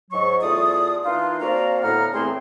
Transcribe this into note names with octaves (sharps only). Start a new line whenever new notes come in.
G#2 F#3 C#6
E2 A3 F4 D5 D#6
E3 A#3 D4 D#4 F4
A#3 C4 F#4 D5 F5 A#5
D2 A2 B3 F#5 A#5 F6
E2 A2 A3 C4 G#4 C6